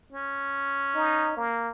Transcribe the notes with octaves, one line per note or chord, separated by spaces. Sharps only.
C#4
D#4
A#3